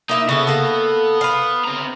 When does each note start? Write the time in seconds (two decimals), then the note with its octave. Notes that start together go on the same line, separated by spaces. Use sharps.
0.09 A#3 D#4 E4 E5
0.29 C#3 B3 A4
0.47 A#3 A4
1.21 B4 F5
1.64 C4 A#5